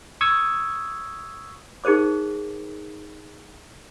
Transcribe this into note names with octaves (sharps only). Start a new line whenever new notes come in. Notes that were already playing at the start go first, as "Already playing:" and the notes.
C#6 D#6 E6 G#6
D#4 G#4 A#4 C5 D6